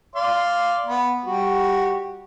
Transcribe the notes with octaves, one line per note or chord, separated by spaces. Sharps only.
D5 F5 C6
B3
G3 F#4 G4